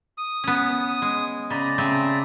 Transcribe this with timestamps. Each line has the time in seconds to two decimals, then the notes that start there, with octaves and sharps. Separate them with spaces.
0.18 D#6
0.44 B3 C#4
1.02 G#3
1.50 C#3 D5 A#5 B5
1.78 C#3 A3 C4